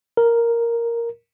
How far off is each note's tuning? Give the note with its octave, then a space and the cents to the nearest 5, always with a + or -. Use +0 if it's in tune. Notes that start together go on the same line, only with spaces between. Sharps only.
A#4 +0